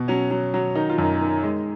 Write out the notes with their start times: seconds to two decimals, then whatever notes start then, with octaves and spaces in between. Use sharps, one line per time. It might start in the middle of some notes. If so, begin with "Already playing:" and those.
Already playing: B2
0.08 F#3 C#4
0.31 F#3
0.54 F#3
0.75 D#3 D#4
0.89 F4
0.98 F#2 D#4
1.21 D#3
1.43 G#3